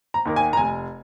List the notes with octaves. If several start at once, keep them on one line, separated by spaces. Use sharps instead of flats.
A#5
D#2 D#3 A#3
G#5
A#5
F1 G#5